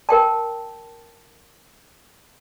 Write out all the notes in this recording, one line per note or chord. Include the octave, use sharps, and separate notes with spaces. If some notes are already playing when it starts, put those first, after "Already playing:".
A#4 G5 A5